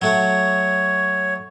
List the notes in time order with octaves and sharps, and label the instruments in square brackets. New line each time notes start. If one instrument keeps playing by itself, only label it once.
[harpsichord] F#3 A3 F#5 [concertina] C#5